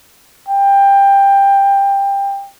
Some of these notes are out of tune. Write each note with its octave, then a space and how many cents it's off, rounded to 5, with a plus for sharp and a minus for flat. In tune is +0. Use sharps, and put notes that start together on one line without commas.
G5 +15